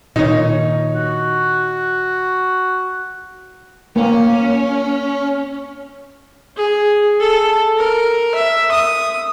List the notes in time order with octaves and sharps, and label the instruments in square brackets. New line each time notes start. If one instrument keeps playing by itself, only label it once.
[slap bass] A#2 D#3 [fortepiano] D#4 C#5
[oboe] F#4
[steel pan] A#3 [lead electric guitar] C#4
[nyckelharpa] G#4
A4
A#4
E5
D#6